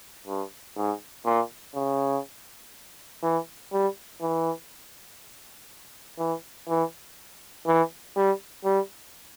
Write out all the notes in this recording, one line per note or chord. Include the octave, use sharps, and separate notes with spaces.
G2
G#2
A#2
C#3
E3
G3
E3
E3
E3
E3
G3
G3